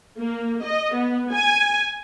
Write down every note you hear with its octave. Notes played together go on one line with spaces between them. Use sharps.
A#3
D#5
B3
G#5